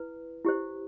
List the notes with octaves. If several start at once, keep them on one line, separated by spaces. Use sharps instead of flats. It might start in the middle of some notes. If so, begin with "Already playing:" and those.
Already playing: E4 B4
E4 G4 C5